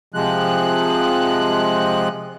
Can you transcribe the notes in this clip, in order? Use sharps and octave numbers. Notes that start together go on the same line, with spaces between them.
C3 F3 G#3 F#6